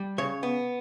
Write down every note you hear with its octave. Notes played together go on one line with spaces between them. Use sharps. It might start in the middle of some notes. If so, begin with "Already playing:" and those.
Already playing: G3
C#3 C#5
B3